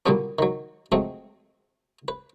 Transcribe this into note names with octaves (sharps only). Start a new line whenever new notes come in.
A#2 D3 F#3 G3 B3 C#4
D#3 F#3
F2 F#3 G#3 A3 C4
B4